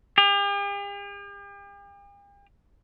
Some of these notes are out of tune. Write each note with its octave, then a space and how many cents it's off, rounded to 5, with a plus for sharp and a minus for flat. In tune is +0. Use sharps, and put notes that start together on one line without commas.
G4 +45